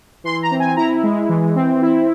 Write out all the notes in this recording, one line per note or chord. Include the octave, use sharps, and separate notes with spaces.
E3 C6
A#5
C4
G#5
E4 A#5
G#3
E3
C4
E4